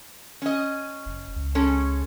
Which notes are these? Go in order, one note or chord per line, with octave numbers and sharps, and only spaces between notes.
C#4 D#5
F#1
C#2
G#3 C#4 A4